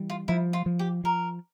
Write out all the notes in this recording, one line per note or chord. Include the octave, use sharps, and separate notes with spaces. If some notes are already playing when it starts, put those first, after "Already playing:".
Already playing: E3 G3
F4
F3 E4
F4
F3
G4
F3 A#4